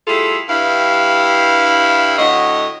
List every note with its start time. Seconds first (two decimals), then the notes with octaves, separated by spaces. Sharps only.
0.08 G3 A3 E4 F4 G#4 A4
0.49 G2 E4 F5
2.18 A2 D3 F#4 C#5 D#5